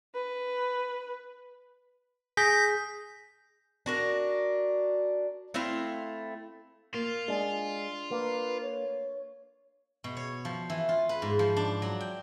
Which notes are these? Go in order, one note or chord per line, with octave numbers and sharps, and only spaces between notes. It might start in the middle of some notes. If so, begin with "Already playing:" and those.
B4
G#4 G6 A#6 B6
D4 F#4 A#4
A3 C4 E4 F5
A#3 F4
G#3 D4
A#3 B4
C#5
B2
C#5
F3
E3
F4
B4
G#2
F3
D4
F#3
G5